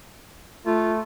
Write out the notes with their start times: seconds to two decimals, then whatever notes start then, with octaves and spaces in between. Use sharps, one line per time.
0.66 A3 F4